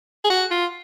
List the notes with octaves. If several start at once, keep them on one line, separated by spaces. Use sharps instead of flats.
G#4
F#4
F4